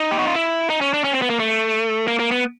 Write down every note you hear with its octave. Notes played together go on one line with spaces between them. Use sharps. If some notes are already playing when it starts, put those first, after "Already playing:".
Already playing: D#4
G4
F#4
F4
E4
D#4
C#4
D4
C#4
C4
B3
A#3
A3
A#3
A#3
B3